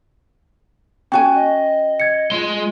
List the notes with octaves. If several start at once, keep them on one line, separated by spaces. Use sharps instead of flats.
C#4 F#4 G5 G#5
D#5
G#6 C#7
G#3 F4 C6